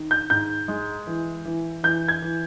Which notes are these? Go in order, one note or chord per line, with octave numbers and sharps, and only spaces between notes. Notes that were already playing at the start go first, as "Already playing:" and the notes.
Already playing: D#3
G6
G#2 G6
G#3
E3
E3
E3 G6
G#6
E3